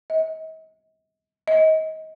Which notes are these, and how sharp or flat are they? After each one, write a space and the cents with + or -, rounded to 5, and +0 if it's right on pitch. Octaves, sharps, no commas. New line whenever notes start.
D#5 +40
D#5 +25